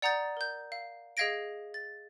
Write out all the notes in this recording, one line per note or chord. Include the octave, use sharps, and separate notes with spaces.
D5 F#5 A#5 D#6 G6 A6
A#4 G6
F5
G#4 D#5 F5 G#6 A#6 D7
A6